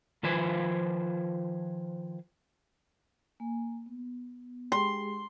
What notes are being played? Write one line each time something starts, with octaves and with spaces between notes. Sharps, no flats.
D#3 F3 F4 B4 C5 G#5
A#3 G#5
B3
G#3 G4 G#4 C6